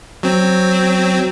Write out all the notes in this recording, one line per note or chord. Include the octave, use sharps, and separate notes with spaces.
F#3 C4